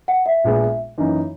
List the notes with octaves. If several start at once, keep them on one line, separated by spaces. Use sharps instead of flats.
F#5
E5
A#1 A#2 G#3 B3
F#2 E3 A#3 D#4